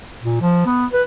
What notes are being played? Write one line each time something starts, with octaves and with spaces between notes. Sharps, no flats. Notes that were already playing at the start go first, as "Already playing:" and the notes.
A#2
F3
B3
B4